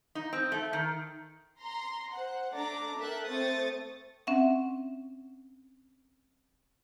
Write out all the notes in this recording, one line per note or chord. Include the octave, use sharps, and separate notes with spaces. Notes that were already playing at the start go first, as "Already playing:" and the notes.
D#4
C4
A3
D#3
A#5 C6
C5 F#5
A3 D4 D5 A#5 D6
A4 A#4 E5 G5 F#6
A3 C4 C5 C#6 D#6 A6
C4 C#4 E5 F#5